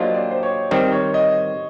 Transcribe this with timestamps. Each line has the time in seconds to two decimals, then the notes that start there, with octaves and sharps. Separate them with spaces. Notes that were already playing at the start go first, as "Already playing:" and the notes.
Already playing: F#3 A#3 D4 F4 G4 C5 D#5
0.14 D5
0.31 C5
0.43 C#5
0.71 D#3 G3 C4 C5
0.92 C#5
1.14 D#5